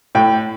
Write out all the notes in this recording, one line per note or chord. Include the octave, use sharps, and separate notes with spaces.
A2 G5